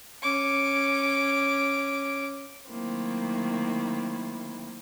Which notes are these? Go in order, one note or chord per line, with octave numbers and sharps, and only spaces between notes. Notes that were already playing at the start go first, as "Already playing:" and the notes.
C#4 D6
D#3 F#3 A3 A#3 C4 E4